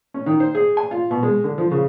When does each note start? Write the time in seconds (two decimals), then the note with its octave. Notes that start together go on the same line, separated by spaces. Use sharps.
0.14 C#4
0.26 D#3
0.40 C5
0.55 G#4
0.77 G#5
0.91 F4
1.11 B2
1.23 G#3
1.44 D3
1.58 F3
1.71 C#3